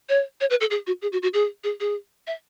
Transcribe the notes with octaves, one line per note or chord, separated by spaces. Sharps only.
C#5
C#5
B4
A4
G#4
F#4
G#4
F#4
F#4
G#4
G#4
G#4
E5